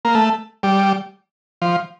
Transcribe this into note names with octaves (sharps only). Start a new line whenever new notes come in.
A#3
A3
G3
F3